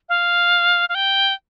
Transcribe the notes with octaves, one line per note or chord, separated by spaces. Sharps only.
F5
F5
G5